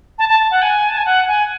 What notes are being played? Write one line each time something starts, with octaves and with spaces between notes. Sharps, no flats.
A5
A5
F#5
G#5
A5
G#5
F#5
G#5